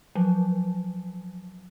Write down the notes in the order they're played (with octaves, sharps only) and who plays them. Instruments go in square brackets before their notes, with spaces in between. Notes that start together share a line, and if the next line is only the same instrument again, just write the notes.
[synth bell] F3 F#3